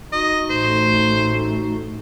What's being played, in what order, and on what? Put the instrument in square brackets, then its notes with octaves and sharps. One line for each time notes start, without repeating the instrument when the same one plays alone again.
[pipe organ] D#4 F#4 [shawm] D#5
[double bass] A1 A3 [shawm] C5